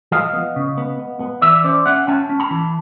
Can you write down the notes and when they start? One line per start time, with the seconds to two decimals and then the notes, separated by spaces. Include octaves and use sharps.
0.12 F3 D#5 F5
0.33 B3
0.56 C#3
0.78 B3
0.99 B3
1.20 B3
1.42 E3 D5 E5
1.64 C#4 C5 D5
1.86 C#4 E5 F#5
2.07 C#4 G5 A5
2.29 C#4
2.40 A5 B5
2.51 E3